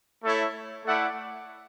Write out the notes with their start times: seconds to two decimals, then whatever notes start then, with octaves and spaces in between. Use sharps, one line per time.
0.23 A3 E4 A4 C#5
0.85 A3 E4 A4 D5 F#5